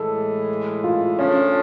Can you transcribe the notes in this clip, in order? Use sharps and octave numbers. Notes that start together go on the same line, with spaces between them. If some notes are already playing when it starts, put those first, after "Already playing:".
Already playing: A2 E3 G#3 A4
F4
C#3 F3 A3 C#4 D4